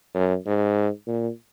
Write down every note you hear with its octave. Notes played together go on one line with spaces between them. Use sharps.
F#2
G#2
A#2